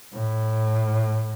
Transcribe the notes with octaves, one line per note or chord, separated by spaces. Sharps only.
A2